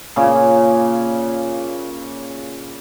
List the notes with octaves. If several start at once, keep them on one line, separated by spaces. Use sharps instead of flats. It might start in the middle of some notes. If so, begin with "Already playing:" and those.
A#2 C#3 C#4